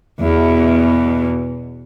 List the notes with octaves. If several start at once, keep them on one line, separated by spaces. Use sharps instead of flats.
E2 B2